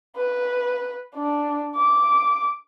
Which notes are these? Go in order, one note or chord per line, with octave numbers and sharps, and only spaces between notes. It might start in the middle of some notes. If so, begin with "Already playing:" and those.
B4
D4
D6